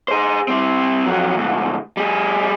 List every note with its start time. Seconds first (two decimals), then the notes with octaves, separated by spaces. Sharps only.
0.08 G#4 C5
0.48 G3 C4
1.06 F2 F#3
1.37 D2 G#2
1.97 G3 G#4